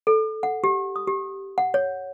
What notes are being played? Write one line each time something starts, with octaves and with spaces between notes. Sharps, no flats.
A4
F#5
G4
D#6
G4
F#5
C#5